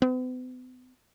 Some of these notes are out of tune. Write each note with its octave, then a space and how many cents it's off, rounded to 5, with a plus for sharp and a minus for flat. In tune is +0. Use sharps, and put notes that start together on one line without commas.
B3 +45